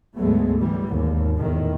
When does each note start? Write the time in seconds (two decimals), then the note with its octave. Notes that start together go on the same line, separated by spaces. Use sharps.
0.16 D2 G#2 F#3 G#3 A3 B3
0.61 E3 G3
0.89 G#1 D#2
1.39 E2 A2 D#3